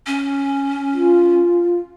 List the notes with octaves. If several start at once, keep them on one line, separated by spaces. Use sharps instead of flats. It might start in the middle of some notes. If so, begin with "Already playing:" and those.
C#4
F4